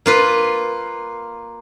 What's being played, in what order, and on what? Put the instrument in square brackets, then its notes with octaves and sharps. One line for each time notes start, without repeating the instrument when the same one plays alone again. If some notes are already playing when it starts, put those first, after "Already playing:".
[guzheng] A#3 F4 B4